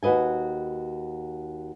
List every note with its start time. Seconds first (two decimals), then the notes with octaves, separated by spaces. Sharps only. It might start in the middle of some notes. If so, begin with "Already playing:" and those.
0.03 D#2 F#4 B4 D#5 G#5